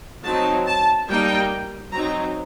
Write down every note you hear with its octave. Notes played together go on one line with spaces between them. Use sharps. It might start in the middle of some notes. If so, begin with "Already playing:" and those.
F#3 C4 D#4 A5
A5
G3 A#3 D#4 G5
F#3 C4 D#4 A#5